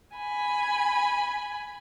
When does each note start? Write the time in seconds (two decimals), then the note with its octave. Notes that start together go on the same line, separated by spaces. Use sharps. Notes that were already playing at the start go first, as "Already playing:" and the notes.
0.17 G#5 B5